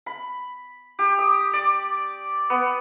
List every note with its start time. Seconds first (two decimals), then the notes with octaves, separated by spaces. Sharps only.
0.06 B5
0.99 G4
1.19 D#6
1.53 D5
2.50 B3